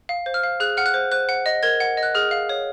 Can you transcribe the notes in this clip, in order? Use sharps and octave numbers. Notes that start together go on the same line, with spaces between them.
F5
C5
F6
F5
G#4 F#6
F#5 F6
F#6
C5
C5 F#6
F#5
D#5
A#4 G#6
F#5
D#5
F#6
G#4 F6
F5
C#5